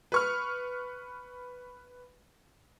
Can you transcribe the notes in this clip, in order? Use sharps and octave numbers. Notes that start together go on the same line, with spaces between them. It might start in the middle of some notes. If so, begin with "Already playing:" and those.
B4 C#6 F6